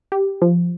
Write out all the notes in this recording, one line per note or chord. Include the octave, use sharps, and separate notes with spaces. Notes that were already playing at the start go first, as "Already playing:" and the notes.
G4
F3